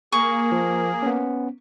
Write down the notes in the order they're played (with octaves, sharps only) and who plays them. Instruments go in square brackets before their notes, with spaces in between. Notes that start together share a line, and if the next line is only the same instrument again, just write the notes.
[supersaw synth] A#3 [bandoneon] G#4 [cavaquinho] C#6
[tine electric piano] F3
B3 C#4